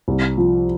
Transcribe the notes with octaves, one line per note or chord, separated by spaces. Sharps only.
C2
F3